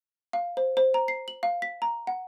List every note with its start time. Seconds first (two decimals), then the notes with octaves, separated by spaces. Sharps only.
0.33 F5
0.57 C5
0.77 C5
0.94 A#5
1.08 C7
1.28 F#7
1.43 F5
1.62 B6
1.82 A#5
2.07 F#5